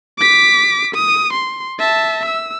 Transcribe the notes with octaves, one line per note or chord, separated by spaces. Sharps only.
D6 B6
D#6
C6
E5 A5
E6